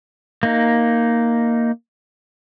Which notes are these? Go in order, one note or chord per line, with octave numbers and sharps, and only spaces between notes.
A#3 D#4